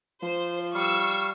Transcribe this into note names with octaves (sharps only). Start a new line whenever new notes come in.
F3 C5
G3 F5 C#6 E6